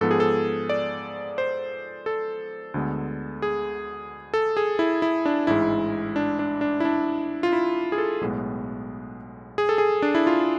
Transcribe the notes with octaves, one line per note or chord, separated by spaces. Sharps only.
G#2 F3 B3 A4
G#4
A4
D5
C5
A4
D2 D3 G#3 B3
G#4
A4
G#4
E4
E4
D4
A1 G#2 G#3 E4
D4
D4
D4
E4
D4
F4
E4
G#4
A4
B1 A2 G#3 B3
G#4
A4
G#4
D4
E4
F4